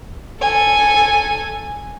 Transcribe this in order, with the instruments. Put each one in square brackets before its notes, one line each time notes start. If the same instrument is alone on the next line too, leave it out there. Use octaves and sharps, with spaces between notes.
[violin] A4 G#5